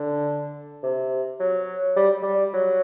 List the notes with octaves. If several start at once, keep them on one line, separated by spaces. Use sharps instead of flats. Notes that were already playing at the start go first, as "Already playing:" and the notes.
Already playing: D3
C3
F#3
G3
G3
F#3